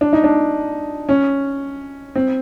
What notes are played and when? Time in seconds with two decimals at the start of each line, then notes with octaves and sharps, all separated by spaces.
0.01 D4
0.13 D#4
0.24 D4
1.09 C#4
2.16 C4